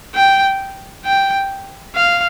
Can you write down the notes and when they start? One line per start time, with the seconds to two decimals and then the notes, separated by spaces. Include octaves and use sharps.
0.15 G5
1.05 G5
1.95 F5